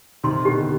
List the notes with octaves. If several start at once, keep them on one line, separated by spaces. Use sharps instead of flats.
C3 D#3 C6
B2 D3 G4